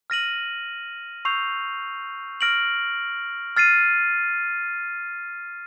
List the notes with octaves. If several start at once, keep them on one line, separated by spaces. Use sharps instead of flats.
F6 A#6 D#7 F#7
C#6 E6 G6 C7 F7
F6 A#6 D7 F#7
F6 A6 C7 D#7